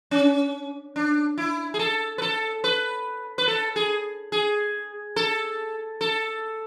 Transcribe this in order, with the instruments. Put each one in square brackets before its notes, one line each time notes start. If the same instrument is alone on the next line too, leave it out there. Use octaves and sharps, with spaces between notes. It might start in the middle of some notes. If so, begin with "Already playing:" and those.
[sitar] C#4
D4
E4
G#4
A4
B4
A4
B4
B4
A4
G#4
G#4
A4
A4